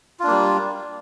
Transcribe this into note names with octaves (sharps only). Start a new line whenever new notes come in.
G3 A#3 D4 F4